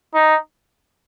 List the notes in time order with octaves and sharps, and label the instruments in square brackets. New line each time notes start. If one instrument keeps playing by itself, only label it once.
[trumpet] D#4